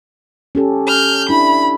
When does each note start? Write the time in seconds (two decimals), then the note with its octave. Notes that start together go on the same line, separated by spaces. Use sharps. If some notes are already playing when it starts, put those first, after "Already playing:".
0.55 C#4 G4 A4
0.88 F6 G6
1.29 D4 E4 B5